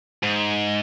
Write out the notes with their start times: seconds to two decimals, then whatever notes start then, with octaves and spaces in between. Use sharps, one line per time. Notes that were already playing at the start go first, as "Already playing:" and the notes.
0.23 G#2